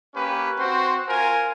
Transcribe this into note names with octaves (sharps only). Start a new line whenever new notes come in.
A#3 C#4 G4 B4
C4 F#4 C5
F4 A#4 G#5